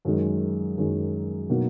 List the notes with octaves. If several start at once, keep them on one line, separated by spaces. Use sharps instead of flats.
F#2 D#3 G#3
F#2 D#3 G#3
B2 F#3 A#3 D#4